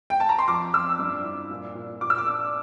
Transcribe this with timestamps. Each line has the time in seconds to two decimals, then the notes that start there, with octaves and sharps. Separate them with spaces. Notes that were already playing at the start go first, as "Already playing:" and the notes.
0.10 G5
0.20 A5
0.29 A#5
0.39 C6
0.47 F2 D6
0.73 F2 E6
0.99 G2 D6
1.24 E4
1.50 A#2
1.75 A#2
2.01 A#2 D6
2.10 E6
2.18 D6
2.26 D4